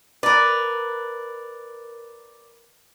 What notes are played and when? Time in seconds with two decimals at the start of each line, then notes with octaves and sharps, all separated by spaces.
0.23 A#4 B4 D5